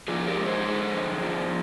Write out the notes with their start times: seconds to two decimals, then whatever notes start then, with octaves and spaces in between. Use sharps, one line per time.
0.08 F3 F4 G#4
0.27 G4 A#4
0.37 G#3
0.46 G#4 C5
0.65 D3
0.94 F2
1.22 F3